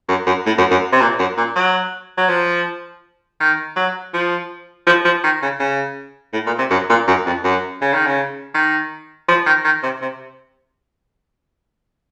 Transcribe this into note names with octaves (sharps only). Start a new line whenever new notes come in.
F#2
F#2
A2
F#2
F#2
C3
A#2
F#2
A#2
F#3
F#3
F3
D#3
F#3
F3
F3
F3
D#3
C#3
C#3
A2
A#2
C3
F#2
A#2
F#2
F2
F#2
C#3
D#3
C#3
D#3
F3
D#3
D#3
C3
C3